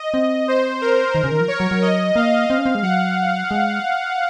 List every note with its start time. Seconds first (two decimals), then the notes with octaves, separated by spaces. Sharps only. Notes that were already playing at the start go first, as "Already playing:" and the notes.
Already playing: D#5
0.14 C4
0.48 C5
0.81 A#4
1.15 D#3
1.24 C#3
1.31 D#3
1.40 F3
1.48 C#5
1.60 F#3
1.71 F#3
1.82 D#5
2.16 A#3 F5
2.50 C4
2.58 C#4
2.66 C4
2.75 G#3
2.83 F#3 F#5
3.51 G#3